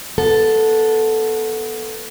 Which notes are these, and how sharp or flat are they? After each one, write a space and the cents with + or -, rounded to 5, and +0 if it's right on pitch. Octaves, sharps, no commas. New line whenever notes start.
B3 -20 A4 +0